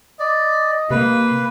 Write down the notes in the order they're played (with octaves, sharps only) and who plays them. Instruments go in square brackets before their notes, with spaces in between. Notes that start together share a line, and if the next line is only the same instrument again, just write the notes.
[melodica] D5 [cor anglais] D#5
[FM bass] C3 [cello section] A#3 [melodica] B4